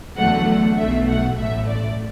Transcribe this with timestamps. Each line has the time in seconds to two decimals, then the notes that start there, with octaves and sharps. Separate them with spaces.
0.17 E2 D3 F#3 A3 F#5
0.77 B1 B2 F#3 A3 E5
1.07 F#5
1.37 A1 A2 A3 E5
1.68 D5